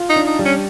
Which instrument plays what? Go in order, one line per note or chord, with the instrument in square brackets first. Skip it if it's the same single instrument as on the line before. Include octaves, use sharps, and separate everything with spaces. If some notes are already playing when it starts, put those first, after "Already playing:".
Already playing: [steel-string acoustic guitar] F4
[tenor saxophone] D#4
[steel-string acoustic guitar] D4
[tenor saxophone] D#4
[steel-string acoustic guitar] G3
[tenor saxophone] C#4